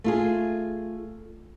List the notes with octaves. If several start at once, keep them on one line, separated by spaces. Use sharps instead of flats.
A3 F4 G#4